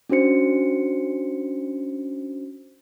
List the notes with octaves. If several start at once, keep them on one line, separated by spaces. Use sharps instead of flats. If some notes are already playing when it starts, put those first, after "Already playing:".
C#4 D4 F#4 C5 C#7